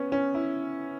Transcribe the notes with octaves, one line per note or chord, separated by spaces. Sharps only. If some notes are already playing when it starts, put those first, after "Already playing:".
Already playing: B3 C#4
C#4
E4